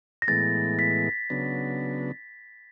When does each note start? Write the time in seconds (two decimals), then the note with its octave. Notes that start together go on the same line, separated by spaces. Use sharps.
0.22 A#6
0.28 A2 E3 G#3 B3 A6
0.79 B6
1.30 C#3 F#3 B3 D4